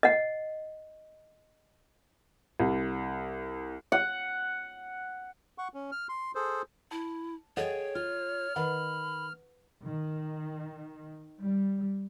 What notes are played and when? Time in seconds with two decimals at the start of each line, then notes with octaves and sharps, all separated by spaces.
0.03 D#5 F#5
2.60 C2
3.92 F#5
5.58 F#5 C#6
5.74 C#4
5.92 F6
6.09 C6
6.35 G#4 A4 C5
6.91 E4 A5
7.57 G#4 A4 C#5 D#5 F#5 G5
7.95 F4 F6
8.56 D#3 B4 F#5 B5
9.85 D#3
11.40 G3